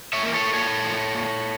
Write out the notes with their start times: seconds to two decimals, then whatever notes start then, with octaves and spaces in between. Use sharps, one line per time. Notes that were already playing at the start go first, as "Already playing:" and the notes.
0.13 C#5 E5
0.23 E3 A#3 A#4
0.34 A4 C#5
0.54 A#2 A4 C#5
0.85 F3 A3
1.15 A#2